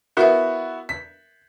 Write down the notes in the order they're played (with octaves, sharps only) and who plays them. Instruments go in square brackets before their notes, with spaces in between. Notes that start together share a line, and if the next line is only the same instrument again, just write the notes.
[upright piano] B3 E4 F#4 [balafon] A#4 E5
[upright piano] B6